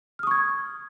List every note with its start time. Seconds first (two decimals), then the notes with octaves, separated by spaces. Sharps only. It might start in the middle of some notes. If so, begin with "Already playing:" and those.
0.19 F6
0.23 D#6
0.27 C#6
0.31 G#6